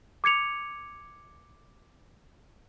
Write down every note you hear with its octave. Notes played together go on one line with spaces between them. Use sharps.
D6 G#6 C#7 F7